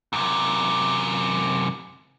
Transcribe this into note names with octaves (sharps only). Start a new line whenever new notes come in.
F#2 C3